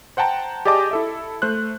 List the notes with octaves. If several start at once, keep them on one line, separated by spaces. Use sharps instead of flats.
C5 F#5 G5 A5 A#5
G4 G#4 D5 D#5 A5 D6
E4 A4 E5
A3 C5 F#6